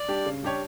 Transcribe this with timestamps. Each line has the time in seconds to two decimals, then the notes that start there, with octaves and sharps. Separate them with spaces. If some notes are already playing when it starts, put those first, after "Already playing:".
Already playing: D5
0.08 G3 D4 G4
0.25 C#3
0.43 G3 D4 G4 C#5